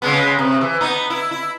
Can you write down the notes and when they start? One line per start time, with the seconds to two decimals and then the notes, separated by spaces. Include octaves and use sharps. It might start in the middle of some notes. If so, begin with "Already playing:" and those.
0.02 C#3 G#3 B3
0.38 C3
0.61 E3
0.81 B3 D#4
1.10 E4
1.31 E4